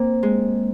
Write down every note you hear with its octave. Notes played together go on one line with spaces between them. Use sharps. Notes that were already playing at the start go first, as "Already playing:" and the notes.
Already playing: A#3 C4
G#3